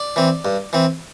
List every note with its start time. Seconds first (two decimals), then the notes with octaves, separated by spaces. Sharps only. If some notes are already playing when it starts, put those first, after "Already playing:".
Already playing: D5
0.16 E3 C4
0.45 G2
0.73 E3 C4